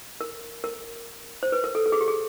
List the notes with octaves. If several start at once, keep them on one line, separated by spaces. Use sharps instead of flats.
A#4
A#4
C5
B4
A#4
A4
A4
G#4
G4
G#4